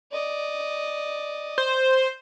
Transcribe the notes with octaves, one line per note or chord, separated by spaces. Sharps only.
D5 D#5
C5